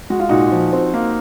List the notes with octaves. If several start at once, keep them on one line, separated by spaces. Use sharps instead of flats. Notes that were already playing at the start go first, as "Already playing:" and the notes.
G#3 F#4
F4
A#2 D#4 F#4
F3
C4
A#3